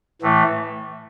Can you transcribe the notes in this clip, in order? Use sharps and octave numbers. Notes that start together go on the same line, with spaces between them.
A2 E3 A3